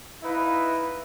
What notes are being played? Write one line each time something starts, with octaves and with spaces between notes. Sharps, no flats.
D#4 E4 B4 F5